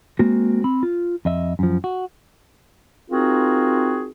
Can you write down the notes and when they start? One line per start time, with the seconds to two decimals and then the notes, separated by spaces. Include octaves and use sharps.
0.19 G#3 A#3 C4 F#4
0.64 C4 B5
0.83 F4
1.25 F2 D#5 E5
1.59 F#2 F3
1.84 F#4
3.10 C4 D#4 F4 F#4 G#4 A#4